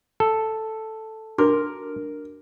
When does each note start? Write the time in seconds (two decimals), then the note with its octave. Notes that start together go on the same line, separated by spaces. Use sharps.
0.20 A4
1.38 D4 F#4 A#4 D6